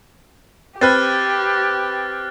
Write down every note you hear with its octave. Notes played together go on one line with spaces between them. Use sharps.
C4 G4 B4 F6 F#6 A6